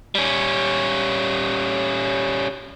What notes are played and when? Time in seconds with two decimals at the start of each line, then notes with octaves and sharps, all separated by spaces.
0.15 G3 C#4